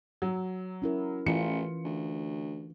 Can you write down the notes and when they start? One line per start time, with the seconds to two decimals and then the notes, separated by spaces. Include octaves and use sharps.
0.22 F#3
0.82 C#4 E4 A#4
1.26 A1 E3 F4 C#7
1.84 D2